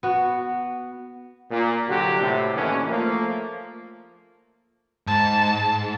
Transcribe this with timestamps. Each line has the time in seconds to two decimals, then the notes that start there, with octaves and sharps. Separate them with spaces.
0.03 B3 F#4
1.51 A#2
1.88 C2 D3 F#3 F#4 G4
2.21 A2 C3
2.55 A1 D#2 D3 E3 C#4
2.89 F3 A3 A#3
5.07 G#2 A5